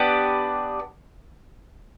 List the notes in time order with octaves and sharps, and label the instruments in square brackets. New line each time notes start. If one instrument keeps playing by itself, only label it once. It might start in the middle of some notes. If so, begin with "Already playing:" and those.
Already playing: [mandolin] B3 D4 G4 B4